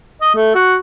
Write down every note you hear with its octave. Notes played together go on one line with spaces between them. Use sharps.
D#5
A3
F#4